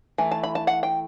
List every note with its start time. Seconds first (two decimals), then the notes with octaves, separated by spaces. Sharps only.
0.18 E3 A3
0.31 A5
0.43 B5
0.55 A5
0.67 F#5
0.83 G5